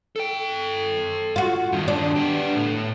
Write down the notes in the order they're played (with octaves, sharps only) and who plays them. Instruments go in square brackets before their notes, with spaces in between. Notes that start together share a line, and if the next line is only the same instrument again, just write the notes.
[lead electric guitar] A4 G5
[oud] F4 F#4
[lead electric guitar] G2 D#3
[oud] D4
[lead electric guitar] B3 G4
A2